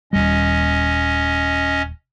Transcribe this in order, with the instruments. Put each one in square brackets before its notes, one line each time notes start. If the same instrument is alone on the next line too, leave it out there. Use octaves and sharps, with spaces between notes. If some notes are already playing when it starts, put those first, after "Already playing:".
[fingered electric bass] D#1 C#2 G3 [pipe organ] C#4 D#5